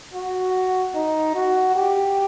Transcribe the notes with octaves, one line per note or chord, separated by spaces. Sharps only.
F#4
D#4
F#4
G4